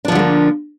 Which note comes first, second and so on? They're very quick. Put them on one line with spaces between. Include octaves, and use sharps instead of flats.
D4 F3 D3 A3 A#3